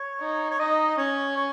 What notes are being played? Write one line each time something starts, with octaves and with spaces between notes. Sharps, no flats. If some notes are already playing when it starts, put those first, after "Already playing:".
Already playing: C#5
D#4
C#5
D#4 D#5
C#4 C#5
C#5